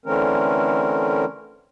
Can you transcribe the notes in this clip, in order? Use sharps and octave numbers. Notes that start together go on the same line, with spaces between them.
D3 E3 A3 C4 C#4 A#4